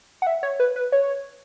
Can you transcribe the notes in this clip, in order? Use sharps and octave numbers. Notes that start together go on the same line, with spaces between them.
F#5
E5
C#5
B4
B4
C#5